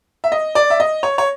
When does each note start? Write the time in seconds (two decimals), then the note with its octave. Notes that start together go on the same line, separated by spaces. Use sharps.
0.24 E5
0.32 D#5
0.55 D5
0.70 E5
0.80 D#5
1.03 C#5
1.18 C#5